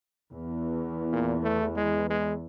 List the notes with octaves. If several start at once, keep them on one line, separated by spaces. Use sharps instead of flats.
E2
A#2
A3
G#3
G#3